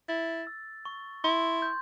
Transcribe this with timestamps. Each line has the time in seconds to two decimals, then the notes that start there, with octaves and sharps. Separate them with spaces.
0.09 E4 A6
0.47 E6
0.85 C#6
1.24 E4 C6
1.62 G6